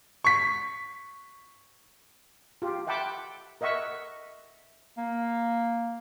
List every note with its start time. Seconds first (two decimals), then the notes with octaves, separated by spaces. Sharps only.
0.24 C#6 B6
2.62 F4 G4
2.87 E5 F#5 G5 A5 B5 D6
3.61 A#4 D#5 E5 F#5 C#6
4.98 A#3